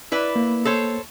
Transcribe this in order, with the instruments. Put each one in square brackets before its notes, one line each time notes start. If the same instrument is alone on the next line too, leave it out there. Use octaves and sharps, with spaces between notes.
[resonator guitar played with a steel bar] E4 B4 D5
[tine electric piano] A#3
[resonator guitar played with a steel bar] A4 C5 C#5